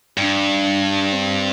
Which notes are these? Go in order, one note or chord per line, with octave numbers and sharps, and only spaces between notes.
G2 D4
C4